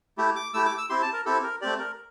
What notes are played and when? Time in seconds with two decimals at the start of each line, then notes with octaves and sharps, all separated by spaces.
0.18 A3 E4 G4
0.36 D6
0.54 A3 E4 G4 E6
0.65 D6
0.78 E6
0.90 C4 E4 G4 C6
1.02 A5
1.13 A#4
1.25 C4 E4 G4 A4
1.43 A#4
1.61 A3 C4 G4 D5
1.79 A#4